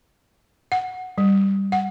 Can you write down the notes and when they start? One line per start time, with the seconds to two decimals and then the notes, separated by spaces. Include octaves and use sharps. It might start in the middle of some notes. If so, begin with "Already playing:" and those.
0.72 F#5
1.18 G3
1.72 F#5